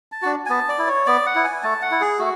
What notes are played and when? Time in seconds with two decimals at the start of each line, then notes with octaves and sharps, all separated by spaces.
0.12 A5
0.22 D4 F#4
0.46 G#5
0.50 B3 A5
0.69 D5
0.79 E4
0.87 C#5
1.06 B3 D5
1.26 F#5
1.35 E4
1.44 G#5
1.63 A3 A5
1.82 F#5
1.91 E4
2.01 G#4
2.19 A3 F#4